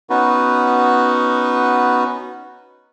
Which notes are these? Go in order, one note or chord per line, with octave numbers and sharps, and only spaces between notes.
B3 C#4 D#4 F#4 B4